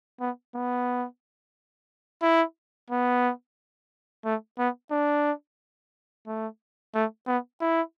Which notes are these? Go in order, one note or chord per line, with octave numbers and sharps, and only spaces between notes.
B3
B3
E4
B3
A3
B3
D4
A3
A3
B3
E4